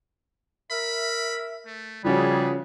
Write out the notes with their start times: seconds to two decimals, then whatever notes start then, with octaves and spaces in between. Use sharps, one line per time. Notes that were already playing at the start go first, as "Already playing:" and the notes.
0.71 A#4 E5 B5
1.67 A3
2.04 C#3 F3 G3 C#4 F#4 G#4 B4